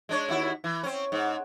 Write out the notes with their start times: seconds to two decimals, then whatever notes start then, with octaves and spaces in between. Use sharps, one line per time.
0.09 G#3 D4 C#5
0.29 D#2 E4 F#4
0.64 E3
0.83 C4 C#4
1.12 G#2